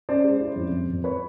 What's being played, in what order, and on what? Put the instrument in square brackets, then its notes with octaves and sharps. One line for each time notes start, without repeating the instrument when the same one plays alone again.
[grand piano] C#4 [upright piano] C5 D5
[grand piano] G#3
E4
F2
F2
F2
[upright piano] B4 C#5